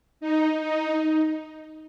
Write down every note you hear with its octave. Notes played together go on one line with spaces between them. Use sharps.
D#4
D#4